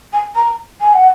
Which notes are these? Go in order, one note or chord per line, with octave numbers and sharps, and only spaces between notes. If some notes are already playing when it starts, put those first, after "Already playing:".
G#5
A#5
G#5
F#5